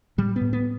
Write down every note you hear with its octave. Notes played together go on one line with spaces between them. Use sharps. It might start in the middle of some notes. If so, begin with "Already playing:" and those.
A2 G3
B3
A2
B3